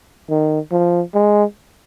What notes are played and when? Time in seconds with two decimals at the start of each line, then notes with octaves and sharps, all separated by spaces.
0.30 D#3
0.72 F3
1.14 G#3